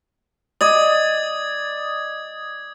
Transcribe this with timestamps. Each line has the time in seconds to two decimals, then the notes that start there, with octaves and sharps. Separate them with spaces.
0.61 D5 D#5 D#6 G#6